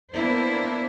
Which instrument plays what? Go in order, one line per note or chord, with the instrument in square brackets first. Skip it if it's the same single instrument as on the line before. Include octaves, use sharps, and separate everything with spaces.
[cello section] A#3 B3 D4 E4 C5